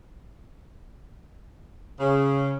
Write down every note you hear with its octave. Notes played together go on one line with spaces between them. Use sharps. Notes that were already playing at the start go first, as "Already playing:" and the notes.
C#3